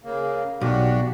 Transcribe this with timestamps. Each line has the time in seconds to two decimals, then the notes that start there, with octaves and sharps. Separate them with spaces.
0.04 C#3 A#3
0.61 B1 D4 F#4 G4